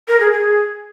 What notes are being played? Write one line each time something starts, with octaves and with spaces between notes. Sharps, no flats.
A#4
G#4
G#4